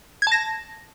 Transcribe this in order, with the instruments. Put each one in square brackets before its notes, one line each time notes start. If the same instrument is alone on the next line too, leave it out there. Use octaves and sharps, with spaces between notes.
[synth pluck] G#6
A5
A#6